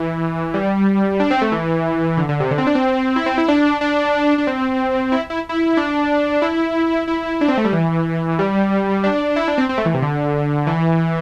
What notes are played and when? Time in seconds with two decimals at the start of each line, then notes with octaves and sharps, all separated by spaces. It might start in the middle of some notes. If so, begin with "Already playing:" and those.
Already playing: E3
0.54 G3
1.20 D4
1.30 C4
1.41 A3
1.52 E3
2.17 D3
2.29 D3
2.40 C3
2.51 D3
2.58 C4
2.67 D4
2.75 C4
3.16 E4
3.26 C4
3.38 E4
3.48 D4
3.81 D4
4.38 D4
4.47 C4
5.12 E4
5.30 E4
5.49 E4
5.77 D4
6.42 E4
7.07 E4
7.41 D4
7.48 C4
7.57 A3
7.65 G3
7.73 E3
8.39 G3
9.04 D4
9.36 E4
9.48 D4
9.58 C4
9.69 C4
9.78 A3
9.85 E3
9.94 C3
10.02 D3
10.67 E3